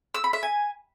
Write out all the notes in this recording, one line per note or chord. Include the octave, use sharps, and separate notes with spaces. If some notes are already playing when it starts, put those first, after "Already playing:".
E6
B5
E5
G#5